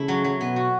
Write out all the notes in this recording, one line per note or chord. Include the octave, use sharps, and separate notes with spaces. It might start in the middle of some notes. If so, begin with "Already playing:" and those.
Already playing: C#3 A3 E4
F#3
F#3
B2 B3
F#4